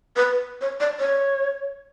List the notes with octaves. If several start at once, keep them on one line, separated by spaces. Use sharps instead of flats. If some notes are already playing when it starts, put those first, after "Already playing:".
B4
C#5
D5
C#5